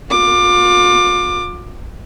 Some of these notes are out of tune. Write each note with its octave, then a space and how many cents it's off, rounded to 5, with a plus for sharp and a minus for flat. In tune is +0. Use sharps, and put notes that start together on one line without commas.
F4 +40 D6 +20